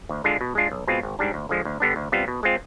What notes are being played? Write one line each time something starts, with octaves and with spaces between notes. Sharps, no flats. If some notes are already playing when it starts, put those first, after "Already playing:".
D2
D3 G#3 D4 F4
B2
G#3 D4 F4
B1
B2 G#3 C4 F4
G#1
G#2 G3 D4
D2
D3 F3 G#3
D2
D3 G3 B3 D4
D2
C3 G3 B3 F4
B2
G#3 C4 F4